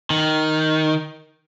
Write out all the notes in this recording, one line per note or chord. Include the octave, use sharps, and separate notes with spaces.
D#3